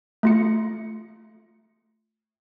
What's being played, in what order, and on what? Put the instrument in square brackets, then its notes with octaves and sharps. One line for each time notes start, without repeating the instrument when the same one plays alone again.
[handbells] A3 F4 C#7